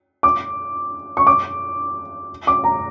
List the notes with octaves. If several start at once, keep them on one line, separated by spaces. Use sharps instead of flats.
D6
C#6
D6
D6
A#5